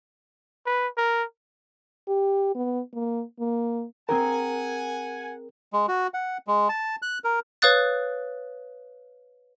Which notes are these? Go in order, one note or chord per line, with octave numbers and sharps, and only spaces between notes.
B4
A#4
G4
B3
A#3
A#3
C4 G#4 A#4 F#5 G#5 A#5
G#3
F#4
F#5
G#3
A5
F#6
A#4
B4 C#5 F5 D#6 F#6 A6